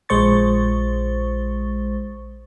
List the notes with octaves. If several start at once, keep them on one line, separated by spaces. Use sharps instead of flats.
A#1 G#3 C5 C#6 A6